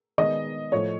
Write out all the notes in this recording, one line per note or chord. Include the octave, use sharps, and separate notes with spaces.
D#3 G#3 B3 D#5
A2 F3 A3 C#5